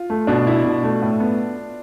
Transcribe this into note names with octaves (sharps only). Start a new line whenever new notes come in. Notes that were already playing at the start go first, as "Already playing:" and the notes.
Already playing: F4
A3
B2 D4
E4
B2
A3
A2
B3